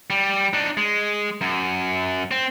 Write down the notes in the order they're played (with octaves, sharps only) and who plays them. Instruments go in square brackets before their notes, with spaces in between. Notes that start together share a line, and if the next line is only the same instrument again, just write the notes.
[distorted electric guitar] G3
D4 D#4
G#3
F#2
C4